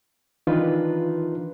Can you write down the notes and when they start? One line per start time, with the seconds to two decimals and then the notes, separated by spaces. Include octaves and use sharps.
0.47 D#3 E3 D4 D#4 F4 B4